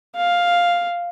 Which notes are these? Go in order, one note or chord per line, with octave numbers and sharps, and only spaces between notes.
F5